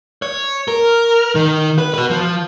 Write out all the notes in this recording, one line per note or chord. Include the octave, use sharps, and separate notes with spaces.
C#5
A#4
D#3
B4
F#4 B4
F3